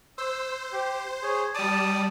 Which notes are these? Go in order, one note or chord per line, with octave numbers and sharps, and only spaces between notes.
C5 E6
G4
G#4 C#5
G3 D5 A5 D#6